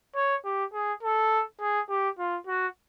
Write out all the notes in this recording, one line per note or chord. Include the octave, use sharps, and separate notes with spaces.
C#5
G4
G#4
A4
G#4
G4
F4
F#4